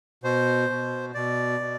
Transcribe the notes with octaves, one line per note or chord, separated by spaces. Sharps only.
B2 C5
B2
B2 D5
B2